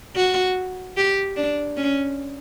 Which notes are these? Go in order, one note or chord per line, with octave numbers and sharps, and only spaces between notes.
F#4
G4
D4
C#4